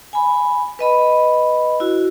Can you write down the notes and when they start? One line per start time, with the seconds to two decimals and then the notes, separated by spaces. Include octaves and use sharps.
0.13 G#5 B5
0.79 B4 D#5 B5
1.80 E4 F#4